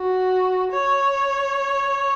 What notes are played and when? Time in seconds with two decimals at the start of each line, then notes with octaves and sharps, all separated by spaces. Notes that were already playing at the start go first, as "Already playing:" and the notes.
Already playing: F#4
0.72 C#5